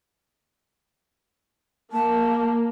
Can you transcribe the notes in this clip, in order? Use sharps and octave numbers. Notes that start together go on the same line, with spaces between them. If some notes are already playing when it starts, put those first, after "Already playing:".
A#3 A5